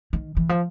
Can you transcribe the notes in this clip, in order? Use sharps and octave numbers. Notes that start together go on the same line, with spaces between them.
D#3
E3
F3